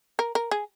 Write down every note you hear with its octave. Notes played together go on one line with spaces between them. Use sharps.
A#4
A#4
G#4